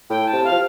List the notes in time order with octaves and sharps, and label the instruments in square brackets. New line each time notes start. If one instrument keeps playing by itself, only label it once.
[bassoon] A2 [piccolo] G5
[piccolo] A5
[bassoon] C3
[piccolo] F5
[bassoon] F3